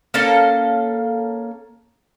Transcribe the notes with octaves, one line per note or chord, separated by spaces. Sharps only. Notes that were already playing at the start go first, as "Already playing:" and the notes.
A#3 C#4 A4 F5